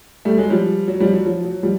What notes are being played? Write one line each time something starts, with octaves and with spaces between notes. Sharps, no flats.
G3 A3
F#3 G#3
F3 G3
F#3
F3 G3
F#3
F3
F#3
F3 G3